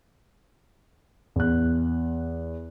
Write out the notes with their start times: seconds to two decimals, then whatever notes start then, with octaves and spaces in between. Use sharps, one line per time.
1.36 E2 F#6